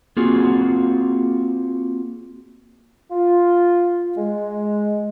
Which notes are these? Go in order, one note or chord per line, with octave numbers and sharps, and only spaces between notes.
A#3 C4 F4 F#4 G#4
F4
G#3